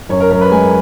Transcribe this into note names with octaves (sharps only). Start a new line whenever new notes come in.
F#2 C#5
A#4
F#2 A#4
B4
G#3 G#5